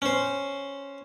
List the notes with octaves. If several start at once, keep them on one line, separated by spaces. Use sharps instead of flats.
C#4 C5